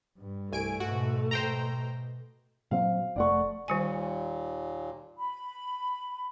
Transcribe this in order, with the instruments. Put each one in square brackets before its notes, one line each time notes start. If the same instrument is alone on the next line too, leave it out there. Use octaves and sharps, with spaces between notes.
[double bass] G2
[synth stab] C2 G#5 D7 [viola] A3
[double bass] G#2 B2 [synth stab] F#4
[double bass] B2 [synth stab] C5 G5 A#5
[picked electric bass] A#2 F#3 C4 [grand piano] F5
[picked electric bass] F1 A3 [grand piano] D5 F#5 C#6
[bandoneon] D#2 A#2 [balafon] D#3 G3 G#5
[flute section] B5